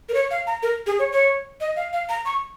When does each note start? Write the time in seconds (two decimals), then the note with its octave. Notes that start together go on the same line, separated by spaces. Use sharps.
0.09 A#4
0.14 C#5
0.31 F5
0.47 A#5
0.63 A#4
0.87 G#4
0.99 C#5
1.12 C#5
1.60 D#5
1.76 F5
1.93 F5
2.09 A#5
2.25 C#6